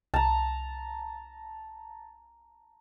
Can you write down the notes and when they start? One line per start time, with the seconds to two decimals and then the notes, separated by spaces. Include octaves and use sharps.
0.14 C2 A5 A#5